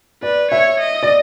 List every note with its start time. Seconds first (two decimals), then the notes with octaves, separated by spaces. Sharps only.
0.23 B4 D5
0.51 C#5 E5
0.80 D#5
1.03 D5